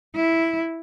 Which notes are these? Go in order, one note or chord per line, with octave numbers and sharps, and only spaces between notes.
E4